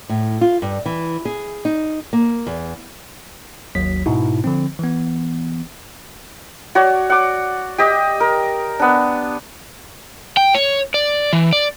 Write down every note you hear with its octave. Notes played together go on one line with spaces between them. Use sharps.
A2
F4
G2
E3
G#4
D#4
A#3
E2
G#1 D#2 F#3 B6
G#2 B2 D#4 E4
D3 F3 C4
E3 B3
F#4 C#5 D5
F#5 D6
G4 D#5
A#4
B3 D4
G5
C#5
D5
E3
D5